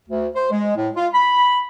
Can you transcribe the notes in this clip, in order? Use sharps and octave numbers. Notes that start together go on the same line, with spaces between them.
D2
C5
G#3
A2
F4
B5